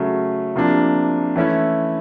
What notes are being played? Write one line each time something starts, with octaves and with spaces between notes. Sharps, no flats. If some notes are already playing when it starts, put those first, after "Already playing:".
Already playing: C#3 F#3 A3
C3 F3 A#3 D4
E3 A3 C#4 E4